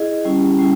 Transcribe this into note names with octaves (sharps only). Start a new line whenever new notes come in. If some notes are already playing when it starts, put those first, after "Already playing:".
Already playing: E4 G#4 D#5
G3 C#4 E4 G4
G3 C#4 E4